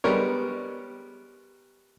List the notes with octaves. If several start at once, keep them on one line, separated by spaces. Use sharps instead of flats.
G3 G#3 B3 A#4 C#5